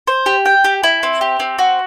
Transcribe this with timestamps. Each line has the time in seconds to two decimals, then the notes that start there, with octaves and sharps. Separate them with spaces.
0.07 C5
0.26 G4
0.46 G5
0.64 G4
0.84 E4
1.03 C4
1.21 G4
1.40 C4
1.59 F#4